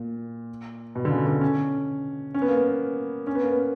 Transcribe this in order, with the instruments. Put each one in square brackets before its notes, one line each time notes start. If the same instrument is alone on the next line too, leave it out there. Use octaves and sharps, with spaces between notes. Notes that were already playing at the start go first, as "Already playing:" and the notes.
Already playing: [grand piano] A#2
B2
D3
C#3
D3
C#4
C#4
B3
A#3
B3
C#4
B3
A#3
B3